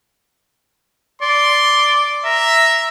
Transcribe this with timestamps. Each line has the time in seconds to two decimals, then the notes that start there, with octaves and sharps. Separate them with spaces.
1.22 D5 C6
2.25 E5 A#5